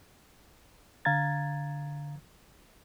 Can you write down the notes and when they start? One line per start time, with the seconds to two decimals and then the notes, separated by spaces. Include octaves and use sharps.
1.05 D3 F5 A#5 G#6 A6